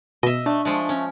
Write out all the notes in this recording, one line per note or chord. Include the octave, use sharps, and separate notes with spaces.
B2 D#5 E5
A3 D4
F3 G#3 A3
C#4